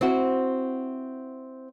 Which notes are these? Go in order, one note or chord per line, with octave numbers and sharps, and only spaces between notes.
C4 E4 F#4 C5